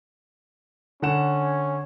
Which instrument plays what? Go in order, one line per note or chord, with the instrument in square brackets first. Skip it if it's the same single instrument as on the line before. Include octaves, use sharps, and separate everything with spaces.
[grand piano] D3 F#5 E7 [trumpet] C#4